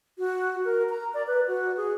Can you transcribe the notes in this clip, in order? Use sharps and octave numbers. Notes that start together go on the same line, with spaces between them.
F#4
A#4
A#5
D5
B4
F#4
G#4